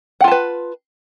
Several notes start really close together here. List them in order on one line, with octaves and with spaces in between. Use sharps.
F#5 F4 A5 B4